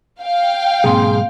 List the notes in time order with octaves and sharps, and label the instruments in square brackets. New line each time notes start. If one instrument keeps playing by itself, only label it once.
[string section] F5 G5
[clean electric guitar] B1 G#2 [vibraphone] A#3 C4 C6 [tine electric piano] G#4